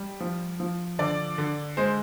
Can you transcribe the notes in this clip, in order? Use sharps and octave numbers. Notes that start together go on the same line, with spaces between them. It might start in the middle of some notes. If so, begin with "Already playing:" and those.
Already playing: G3
F3
F3
D3 D5
D3
G#3 C5